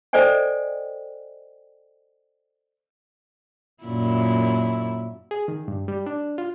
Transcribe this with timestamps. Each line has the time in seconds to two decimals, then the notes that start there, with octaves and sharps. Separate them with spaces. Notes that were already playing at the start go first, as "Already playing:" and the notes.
0.13 A4 C5 D5 D#5 G5 G#5
3.84 F#2 A#2 E4
5.31 G#4
5.48 D#3
5.68 G2
5.88 G3
6.06 D4
6.38 F4